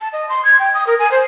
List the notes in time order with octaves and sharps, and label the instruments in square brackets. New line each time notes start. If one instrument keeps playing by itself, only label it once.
[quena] A5
D#5
C6
G#6
G5
D#6
A#4
G#5
C5